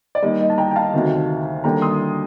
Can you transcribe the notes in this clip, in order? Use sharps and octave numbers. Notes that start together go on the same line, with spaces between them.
D5
D#2 D#3 G3 D#5
D#5
A5
G5 A#5
G5
F5 A5
D2 C3 D#3
D#2 D3 G3 D4 G5 A#5
C6 D#6